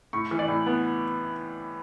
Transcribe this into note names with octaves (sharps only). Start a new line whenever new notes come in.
A2 C#6
E3
D5
A2
B3